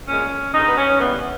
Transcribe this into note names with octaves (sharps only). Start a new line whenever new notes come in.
A#2 G#3 C#4
G2 D#3 G#3 D#4
B3
C#4
D#2 C#3 E3 G3 B3